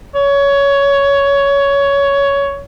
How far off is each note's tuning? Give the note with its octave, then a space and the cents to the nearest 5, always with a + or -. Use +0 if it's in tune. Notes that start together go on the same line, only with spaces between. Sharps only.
C#5 +15